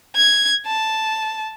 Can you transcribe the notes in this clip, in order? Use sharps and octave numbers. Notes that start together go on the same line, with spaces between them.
G#6
A5